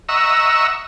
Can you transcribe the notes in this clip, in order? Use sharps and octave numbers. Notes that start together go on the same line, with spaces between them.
D#5 E5 F#5 A#5 C#6 E6